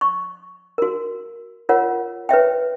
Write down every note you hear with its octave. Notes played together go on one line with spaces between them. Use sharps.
C#6
F#4 A#4
F4 A#4 C#5 F#5
B4 C#5 E5 G5